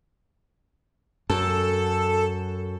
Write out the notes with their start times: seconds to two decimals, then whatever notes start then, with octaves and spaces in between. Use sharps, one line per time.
1.29 F#2 A4